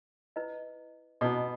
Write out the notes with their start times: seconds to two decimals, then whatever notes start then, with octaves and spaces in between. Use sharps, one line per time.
0.36 E4 B4 D#5
1.21 B2 E4 B4 D#5